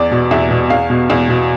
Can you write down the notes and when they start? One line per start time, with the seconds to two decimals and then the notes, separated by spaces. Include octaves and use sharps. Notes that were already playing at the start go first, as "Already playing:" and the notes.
Already playing: E2 D5
0.11 B2
0.31 E2 E5
0.51 B2
0.70 E2 F5
0.90 B2
1.10 E2
1.29 B2